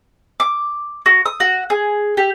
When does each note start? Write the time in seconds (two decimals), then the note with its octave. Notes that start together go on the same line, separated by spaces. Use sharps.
0.40 D6
1.06 F#4
1.26 D#6
1.40 F#4
1.70 G#4
2.17 G4